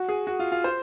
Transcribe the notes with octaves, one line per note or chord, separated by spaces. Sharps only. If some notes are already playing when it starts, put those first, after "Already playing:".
Already playing: F#4
G#4
F#4
F4
F4
C5